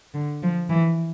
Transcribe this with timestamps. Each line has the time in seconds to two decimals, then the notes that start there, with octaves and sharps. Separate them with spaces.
0.14 D3
0.43 F3
0.70 E3